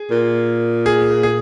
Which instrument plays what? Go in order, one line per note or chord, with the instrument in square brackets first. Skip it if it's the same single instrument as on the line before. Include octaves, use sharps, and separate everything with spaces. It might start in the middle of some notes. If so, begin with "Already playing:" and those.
Already playing: [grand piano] G#4
[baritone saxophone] A#2
[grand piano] G#4
G#4